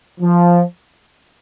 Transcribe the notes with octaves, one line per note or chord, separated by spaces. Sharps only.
F3